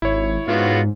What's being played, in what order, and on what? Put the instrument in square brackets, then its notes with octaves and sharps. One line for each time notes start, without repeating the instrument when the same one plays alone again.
[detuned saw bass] G#1 [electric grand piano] E4 C#5
[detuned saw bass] G#2 [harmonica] B3 F4 F#4